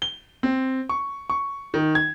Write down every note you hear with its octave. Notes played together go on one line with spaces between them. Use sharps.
G7
C4
C#6
C#6
D#3
G#6